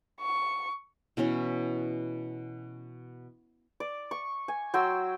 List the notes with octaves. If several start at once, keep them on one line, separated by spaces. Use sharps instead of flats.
C#6
B2 E3 C#4 B5
D5
C#6
G#5
F#3 G5 C6 E6